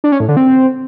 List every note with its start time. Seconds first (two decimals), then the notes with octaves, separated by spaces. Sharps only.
0.04 D4
0.12 C#4
0.20 A2
0.28 D3
0.37 C4